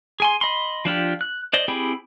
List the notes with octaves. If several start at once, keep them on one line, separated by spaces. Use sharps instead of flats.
G#4 G#5 C6
D#5 B5 C6
F3 D4 F4 G4
F#6
C5 D5 D#5
C4 E4 G4 G#4 B5